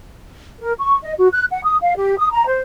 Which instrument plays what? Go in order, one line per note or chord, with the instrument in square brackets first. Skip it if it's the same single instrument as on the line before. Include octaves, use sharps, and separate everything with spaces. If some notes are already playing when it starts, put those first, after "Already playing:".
[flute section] A#4
C#6
D#5
F#4
F#6
F#5
D#6
F5
G4
D#6
A#5
C5